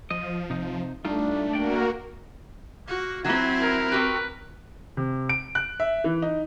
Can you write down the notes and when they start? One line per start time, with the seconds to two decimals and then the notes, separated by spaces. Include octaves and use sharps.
0.10 F3 D#5
0.50 C3 D#4
1.05 G3 A3 D4 D#4 F4
1.53 A#3 F#4 A#4 D5 G5
2.87 A#3 F#4
3.25 F#3 C4 E4 F#4 G#5
3.60 A#4
3.92 C4 F#4 G4 B4
4.97 C3
5.29 D7
5.55 F#6
5.80 E5
6.04 E3
6.22 D#4